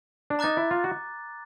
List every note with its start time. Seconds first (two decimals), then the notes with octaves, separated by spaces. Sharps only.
0.30 D4
0.39 D#4 A#5 D6 F#6 A6
0.57 E4
0.71 F4
0.84 F#4